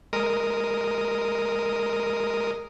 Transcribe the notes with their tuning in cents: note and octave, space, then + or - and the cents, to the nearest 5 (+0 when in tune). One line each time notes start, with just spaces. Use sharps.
G#3 +0 A#4 +0 D#6 +0